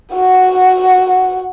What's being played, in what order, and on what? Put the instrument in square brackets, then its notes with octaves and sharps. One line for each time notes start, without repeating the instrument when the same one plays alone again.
[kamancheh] F#4 F#5